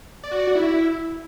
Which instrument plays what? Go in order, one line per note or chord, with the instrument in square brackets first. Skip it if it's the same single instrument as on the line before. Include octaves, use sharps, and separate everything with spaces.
[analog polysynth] D5
F#4
D5
F#4
E4